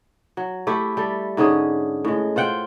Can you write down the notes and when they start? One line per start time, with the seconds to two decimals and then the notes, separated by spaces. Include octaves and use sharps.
0.37 F#3
0.67 A3 E4 G4
0.97 G3 A4
1.37 G#2 D3 C#4 G#4
2.05 A2 G#3
2.36 F4 C5 F#5 G5